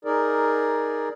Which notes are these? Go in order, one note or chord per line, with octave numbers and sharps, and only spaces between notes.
D#4 G#4 A#4 D5